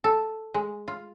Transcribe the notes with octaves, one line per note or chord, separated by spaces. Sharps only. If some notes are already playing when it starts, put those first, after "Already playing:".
A4
G#3
F4